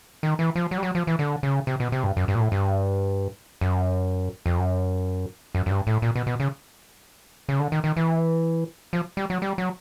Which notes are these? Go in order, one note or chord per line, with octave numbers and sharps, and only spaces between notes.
D#3
E3
F3
F#3
G3
F#3
F3
E3
D3
C#3
C3
B2
C3
G2
F#2
G2
A#2
A2
G2
F#2
F2
F#2
F#2
F#2
G2
A2
A#2
B2
B2
C#3
C#3
D3
D#3
D#3
E3
F3
G3
F#3
G3
F#3